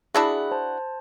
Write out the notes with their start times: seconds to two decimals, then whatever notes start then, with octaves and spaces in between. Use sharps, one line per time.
0.14 D4 E4 F#4 G#4 E5 B5
0.51 C5 A5